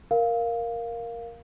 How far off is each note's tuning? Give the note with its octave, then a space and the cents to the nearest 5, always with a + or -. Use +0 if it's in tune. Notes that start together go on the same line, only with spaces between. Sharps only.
A#4 +0 F5 +0